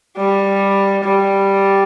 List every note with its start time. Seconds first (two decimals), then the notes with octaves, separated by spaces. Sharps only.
0.17 G3
1.05 G3